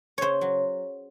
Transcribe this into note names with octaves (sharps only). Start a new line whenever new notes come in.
C#3 C5 C#5
F#3